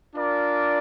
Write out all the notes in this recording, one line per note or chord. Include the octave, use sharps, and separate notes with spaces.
D4 F4 A#4 D5